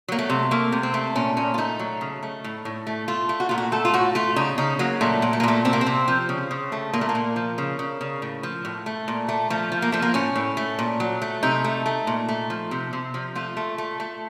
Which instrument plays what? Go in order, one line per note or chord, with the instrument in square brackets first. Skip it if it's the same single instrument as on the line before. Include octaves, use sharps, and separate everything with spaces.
[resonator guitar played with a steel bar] F#3 A#3
A3
C3
A3 A#3
C3
C4
A3
A#2 C#4
A#2 C#4
F4
A3 D#4
F#3
C#3
A3
A2
A2
A3
A3 F4
A3
F#4
A#2 F4
F#4
A3 A4
F4
A2 F#4
A3 F4
C#3 D#4
C#3 D#4
F#3 A#3
A#2 A3
A#2
A3
A#3
A#2 A3
C3 C4
A#3
C4
C3
F3
C#3
C#3
A3
A#2 A#3
A3
A#3
A#2
F3
C#3
C#3
C#3
A2
F3
A2
A3
A#2
A3
F3 A3
F3
A#3
F3 A3
A#3
A2 C#4
A2
A3
A#2
F#3
A3
C3 D#4
A3
A3
A#2
A3
F3
C3
C3
F3
A3 F4
A3
A3
A3